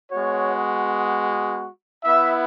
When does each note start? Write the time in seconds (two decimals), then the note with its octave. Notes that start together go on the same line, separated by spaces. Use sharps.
0.11 G#3 B3 F#4 C#5
2.05 B3 E4 E5